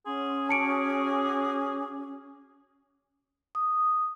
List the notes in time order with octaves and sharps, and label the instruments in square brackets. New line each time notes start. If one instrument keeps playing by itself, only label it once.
[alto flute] C#4 [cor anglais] G#4 [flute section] F#5 C6
[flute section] F#4 C#6 D6 [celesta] A5 C#7 D7
[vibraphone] D#6